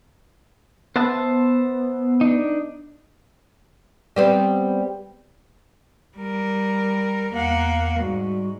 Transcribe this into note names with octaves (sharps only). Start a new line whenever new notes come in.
B3 C5 E5 A5
D4 D#4
G3 B3 C4
G3 A#4
E2 A#3 F5 F#5
G#2 G3 F#4